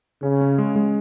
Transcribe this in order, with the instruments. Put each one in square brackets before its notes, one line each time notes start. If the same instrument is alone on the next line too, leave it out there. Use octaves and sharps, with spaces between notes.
[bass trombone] C#3 [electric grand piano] C#4
[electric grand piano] C#4
G#3
G#3